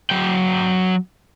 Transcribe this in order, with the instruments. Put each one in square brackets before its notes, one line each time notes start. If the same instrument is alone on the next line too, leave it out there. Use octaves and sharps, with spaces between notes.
[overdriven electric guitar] F#3 G5